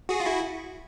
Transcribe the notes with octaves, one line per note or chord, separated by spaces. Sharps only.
F#4 G#4
F4
E4 F#4